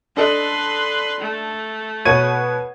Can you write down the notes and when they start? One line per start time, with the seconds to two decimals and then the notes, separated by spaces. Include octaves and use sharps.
0.17 D4 A4 B4 D#5 C6
1.21 A3
2.05 B2 B4 C#5 C#6 G#6 D#7